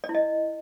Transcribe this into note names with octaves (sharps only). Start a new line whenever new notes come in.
D5
E4
D#5